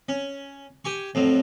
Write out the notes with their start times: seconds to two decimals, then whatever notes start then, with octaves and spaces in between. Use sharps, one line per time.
0.09 C#4
0.85 G4 G#5 C#6
1.15 F2 A2 F#3